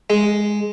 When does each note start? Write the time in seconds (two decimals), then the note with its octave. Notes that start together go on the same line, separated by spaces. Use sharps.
0.10 G#3